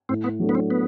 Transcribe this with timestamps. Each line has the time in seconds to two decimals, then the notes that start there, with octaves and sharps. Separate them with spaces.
0.09 A2 C4
0.24 B3
0.40 F#3 A3 D4
0.49 B3
0.55 C4
0.70 B3